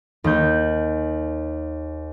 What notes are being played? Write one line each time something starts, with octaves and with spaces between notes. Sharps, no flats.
D#2 G6